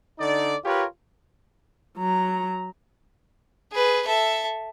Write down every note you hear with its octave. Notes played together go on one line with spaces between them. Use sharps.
D3 D#4 D5
F4 G4 A#4 B4 C#5
F#3 A#5
G#4 B4
A4 E5